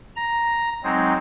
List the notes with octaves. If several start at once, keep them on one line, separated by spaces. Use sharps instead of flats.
A#5
F#3 G#3 C4 D#4